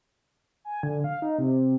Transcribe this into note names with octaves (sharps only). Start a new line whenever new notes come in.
G#5
D3
F5
D#4
C3